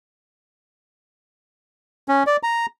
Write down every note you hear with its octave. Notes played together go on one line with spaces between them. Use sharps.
C#4
D5
A#5